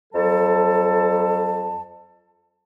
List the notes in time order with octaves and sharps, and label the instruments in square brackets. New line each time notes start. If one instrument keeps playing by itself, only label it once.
[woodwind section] F2 F#3 A4 A5